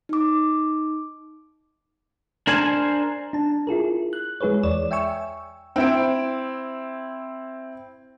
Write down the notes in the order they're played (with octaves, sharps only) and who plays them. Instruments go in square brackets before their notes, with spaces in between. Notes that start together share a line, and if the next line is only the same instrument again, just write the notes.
[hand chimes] D#4 D6
[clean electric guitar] D4 A#4 C5 G#5
[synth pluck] D4 A5
E4 F4 G#4 A#4
F#6
G#3 E4 G#4 B4 C#5
E2 C#5 D5 E7
E5 G5 G#5 C#6 E6
[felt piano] C4 E4 D7